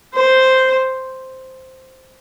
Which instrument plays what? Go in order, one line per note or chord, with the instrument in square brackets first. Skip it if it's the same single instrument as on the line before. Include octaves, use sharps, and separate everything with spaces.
[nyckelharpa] C5